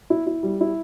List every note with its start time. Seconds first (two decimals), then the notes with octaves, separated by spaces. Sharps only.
0.10 E4
0.27 E4
0.43 G3
0.61 E4